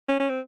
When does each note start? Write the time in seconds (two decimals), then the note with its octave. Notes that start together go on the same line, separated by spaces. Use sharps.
0.08 C#4
0.20 C#4
0.29 C4